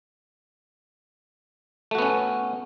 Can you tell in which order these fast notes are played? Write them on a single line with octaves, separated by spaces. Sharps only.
A3 F#4 B3 C#4